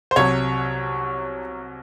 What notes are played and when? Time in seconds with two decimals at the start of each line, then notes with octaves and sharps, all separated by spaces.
0.11 C5
0.16 C2 C3 F#3 C#5